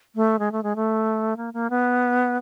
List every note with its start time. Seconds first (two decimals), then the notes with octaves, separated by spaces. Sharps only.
0.16 A3
0.39 G#3
0.52 A3
0.63 G#3
0.76 A3
1.37 A#3
1.54 A#3
1.70 B3